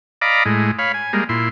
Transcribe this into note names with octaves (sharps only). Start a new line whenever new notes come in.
D5 D#5 F5 A#5 B5 D6
A2 G#3
C#5 F5 B5
G#5
G3 G#3 A#3
A#2 E4 C6